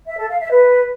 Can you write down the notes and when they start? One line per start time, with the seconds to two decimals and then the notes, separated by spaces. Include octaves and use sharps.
0.07 E5
0.18 A4
0.29 F5
0.40 E5
0.51 B4